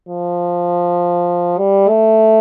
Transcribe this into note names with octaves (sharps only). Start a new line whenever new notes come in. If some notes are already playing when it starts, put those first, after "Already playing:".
F3
G3
A3